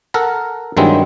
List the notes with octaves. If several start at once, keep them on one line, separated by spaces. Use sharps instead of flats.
A4 A#4 F#5 A5
G2 D#3 F#3 G#3 C4 E4